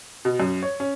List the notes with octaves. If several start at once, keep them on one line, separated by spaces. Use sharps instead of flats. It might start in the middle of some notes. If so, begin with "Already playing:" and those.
B2
F#2
C#5
C#4